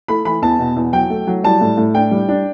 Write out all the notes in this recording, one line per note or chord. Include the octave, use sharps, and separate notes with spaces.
A3 B5
E3 B5
E2 A5
B2
E2
F#3 G5
A3
F#3
G3 A5
A2
A2
D4 G5
G3
D4